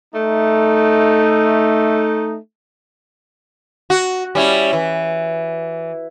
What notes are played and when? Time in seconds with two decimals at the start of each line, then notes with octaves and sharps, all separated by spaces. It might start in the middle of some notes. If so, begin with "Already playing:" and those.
0.14 A3 D#4
3.90 F#4
4.35 G3 C#4 E4
4.73 E3